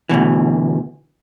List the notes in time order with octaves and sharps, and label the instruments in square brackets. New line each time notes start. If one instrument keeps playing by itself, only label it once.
[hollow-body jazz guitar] D2 G#2 B2 E3